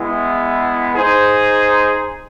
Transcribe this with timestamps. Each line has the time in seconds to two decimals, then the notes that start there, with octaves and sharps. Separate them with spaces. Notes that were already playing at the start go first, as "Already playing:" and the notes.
Already playing: G#3 B3 E4
0.95 D#4 G#4 C5